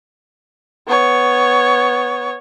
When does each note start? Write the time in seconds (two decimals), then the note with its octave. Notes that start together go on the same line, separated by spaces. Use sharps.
0.88 B3 C#5